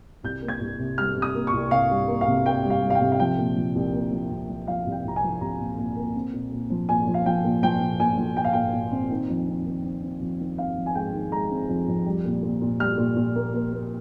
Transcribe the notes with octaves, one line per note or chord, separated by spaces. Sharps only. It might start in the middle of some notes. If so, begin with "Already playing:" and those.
C2 G6
A#3
G#6
C2
C3
G3 F6
C3
D#6
A#3
C#6
C2
C3 F5
G3
A#3
F5
C3
A#3 G5
G3
F5
G3
F5
G5
C3
F5
F3 G5
A#2
F3
C2
A#3
F3
C2
F3
F3 F5
C2
G5
C2 A#5
G#5
F3
C2 A#5
A#2
A#2
A#3
C4
A#2
A#2
F3
A#2 G#5
F3
F5
F3 G5
A#2
F3 G5
A#2
A#2 G#5
F3
A#2 G5
F5
A#2 G5
A#2
C4
D#3
F2
C4
D#3
C4
C4
F2
D#3
C4 F5
F2
G#5
G#3 G5
D#3
G#3 A#5
C4
F2
F2
G3
A#2
A#2
A#2
G3 F6
A#2
A#2
A#3
A#3
A#3